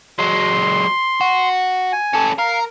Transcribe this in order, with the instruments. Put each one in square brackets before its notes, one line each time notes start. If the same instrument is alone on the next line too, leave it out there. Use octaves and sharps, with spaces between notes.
[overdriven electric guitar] F#3 G#3 [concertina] C6
[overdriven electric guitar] F#4
[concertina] G#5
[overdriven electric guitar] C#4 A4
[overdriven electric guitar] A#4 [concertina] F5